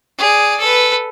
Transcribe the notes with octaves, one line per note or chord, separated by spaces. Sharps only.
G#4 D5
A4 B4